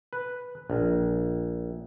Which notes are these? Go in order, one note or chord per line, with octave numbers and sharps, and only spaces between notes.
B4
A#1